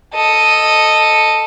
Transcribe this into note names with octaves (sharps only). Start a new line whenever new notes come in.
A4 D#5